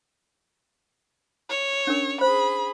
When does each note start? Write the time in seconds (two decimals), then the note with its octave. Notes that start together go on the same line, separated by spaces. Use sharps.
1.50 C#5
1.87 C#4 D4 A#4
2.21 G#4 C5 B5